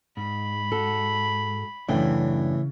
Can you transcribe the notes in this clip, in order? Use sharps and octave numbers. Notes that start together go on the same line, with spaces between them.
G#2 B5
F#4 A4
F#2 A2 C#3 E3 D4 G5